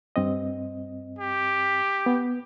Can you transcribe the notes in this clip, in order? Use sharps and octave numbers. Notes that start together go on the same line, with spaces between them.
G2 C4 D#5
G4
B3